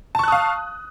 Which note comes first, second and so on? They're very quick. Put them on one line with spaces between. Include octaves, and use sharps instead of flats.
A5 C#6 F#6 D#6 F5